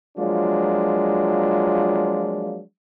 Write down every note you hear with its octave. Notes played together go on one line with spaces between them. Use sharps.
F3 F#3 G#3 A#3 D4 F4